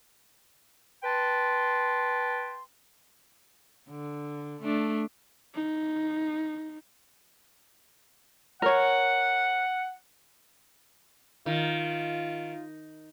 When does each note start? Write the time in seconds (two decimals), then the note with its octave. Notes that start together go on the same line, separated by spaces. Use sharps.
1.03 B4 G5 A5 C6
3.90 D3
4.62 A3 D4
5.54 D#4
8.62 A#4 C#5 F#5
11.46 D#3 F4